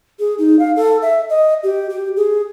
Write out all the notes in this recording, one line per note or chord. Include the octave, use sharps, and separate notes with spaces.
G#4
D#4
F5
A4
E5
D#5
G4
G4
G#4